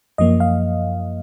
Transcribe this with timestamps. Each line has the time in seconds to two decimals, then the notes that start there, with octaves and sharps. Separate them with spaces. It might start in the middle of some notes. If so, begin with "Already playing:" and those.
0.18 F#2 F3 A#3 D#5
0.40 F5